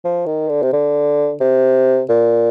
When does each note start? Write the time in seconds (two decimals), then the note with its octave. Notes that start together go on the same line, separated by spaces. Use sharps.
0.04 F3
0.26 D#3
0.49 D3
0.62 C3
0.73 D3
1.40 C3
2.09 A#2